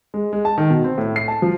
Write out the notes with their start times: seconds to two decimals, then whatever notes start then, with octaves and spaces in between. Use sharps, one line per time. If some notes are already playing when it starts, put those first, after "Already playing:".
0.14 G#3
0.33 G#3
0.45 A5
0.58 D#3
0.70 B2
0.84 C4
0.98 A2
1.16 C7
1.28 A5
1.42 F3